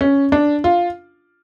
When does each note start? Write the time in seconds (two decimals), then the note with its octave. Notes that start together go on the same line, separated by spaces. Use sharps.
0.01 C#4
0.32 D4
0.64 F4